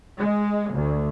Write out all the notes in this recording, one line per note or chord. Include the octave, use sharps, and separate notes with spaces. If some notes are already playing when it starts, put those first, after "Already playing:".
G#3
D2